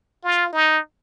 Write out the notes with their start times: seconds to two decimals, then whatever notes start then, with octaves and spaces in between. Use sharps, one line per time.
0.24 F4
0.53 D#4